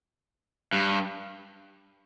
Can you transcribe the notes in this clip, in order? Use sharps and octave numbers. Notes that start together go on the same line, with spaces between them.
G2